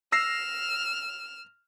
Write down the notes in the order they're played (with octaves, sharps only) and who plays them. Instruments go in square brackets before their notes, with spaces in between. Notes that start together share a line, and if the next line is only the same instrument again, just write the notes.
[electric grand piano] E6 A#6 C7 [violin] F6 E7